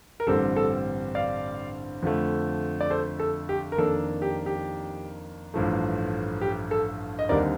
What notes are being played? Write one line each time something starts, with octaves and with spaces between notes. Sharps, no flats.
A#4
A1 G2 D3 G3 C4 A4
A4
D5 F5
F2 D3 F3 A3
D5
A4 C5
A4
G4
A#4
F2 D#3 A#3 D4 A4
G4
G4
A1 G2 F3 A3
G4
A4
D#5
D#2 D3 G3 C4 D#4 A#4 D5